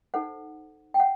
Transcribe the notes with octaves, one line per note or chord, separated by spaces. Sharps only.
D#4 A4 C5 F#5
G5
F#5